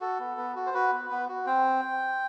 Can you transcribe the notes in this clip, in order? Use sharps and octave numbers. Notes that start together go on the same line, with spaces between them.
F#4 A4
B3
B3
F#4
C5
F#4 B4
B3
B3
F#4
C4 G5